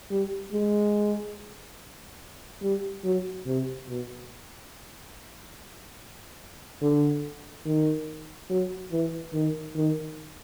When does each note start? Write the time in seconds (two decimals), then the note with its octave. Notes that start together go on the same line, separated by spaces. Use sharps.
0.11 G3
0.53 G#3
2.62 G3
3.04 F#3
3.46 C3
3.88 B2
6.82 D3
7.65 D#3
8.50 F#3
8.91 E3
9.33 D#3
9.75 D#3